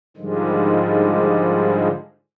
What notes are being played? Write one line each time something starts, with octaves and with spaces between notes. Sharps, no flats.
G#2 D3 D#3 F3 G3 G#3